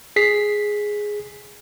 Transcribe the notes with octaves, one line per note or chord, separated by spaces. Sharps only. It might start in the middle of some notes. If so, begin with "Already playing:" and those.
G#4 B6 C7